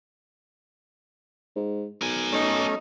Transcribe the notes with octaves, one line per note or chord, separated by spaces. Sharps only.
G#2
B1 A#4 G#5
A3 C#4 D#4